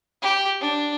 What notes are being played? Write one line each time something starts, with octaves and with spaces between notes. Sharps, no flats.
G4
D4